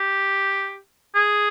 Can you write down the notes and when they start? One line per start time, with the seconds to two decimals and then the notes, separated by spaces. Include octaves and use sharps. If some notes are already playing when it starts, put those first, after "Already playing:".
Already playing: G4
1.15 G#4